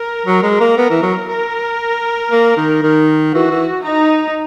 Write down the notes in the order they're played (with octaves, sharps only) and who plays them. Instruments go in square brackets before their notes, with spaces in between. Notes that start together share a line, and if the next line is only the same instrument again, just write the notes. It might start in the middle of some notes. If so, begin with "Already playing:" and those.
Already playing: [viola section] A#4
[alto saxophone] F#3
G#3
A#3
B3
E3
F#3
[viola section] A#4
[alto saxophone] A#3
D#3
D#3
[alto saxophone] E3 [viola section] F#4
[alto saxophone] E3
[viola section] D#4